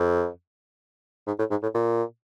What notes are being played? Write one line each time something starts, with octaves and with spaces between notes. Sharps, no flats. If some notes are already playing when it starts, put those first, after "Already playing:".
Already playing: F2
G#2
A2
G#2
A2
A#2